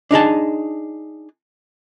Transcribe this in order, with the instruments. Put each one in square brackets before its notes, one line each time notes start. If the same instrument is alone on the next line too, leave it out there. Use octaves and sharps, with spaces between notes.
[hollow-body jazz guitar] D4 D#4 G#4 A5